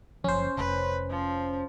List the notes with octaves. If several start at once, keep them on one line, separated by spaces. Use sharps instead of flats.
F#1 F3 C#4 C5
F1 B4
F3